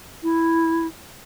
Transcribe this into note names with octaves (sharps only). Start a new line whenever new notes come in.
E4